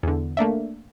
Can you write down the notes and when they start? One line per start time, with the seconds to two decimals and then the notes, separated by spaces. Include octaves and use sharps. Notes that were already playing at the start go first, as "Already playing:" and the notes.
0.03 E2 D3
0.37 A3 A#3 D4 E5